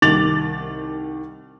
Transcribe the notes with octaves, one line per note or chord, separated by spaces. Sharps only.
C2 D#3 D6 A6 F7 F#7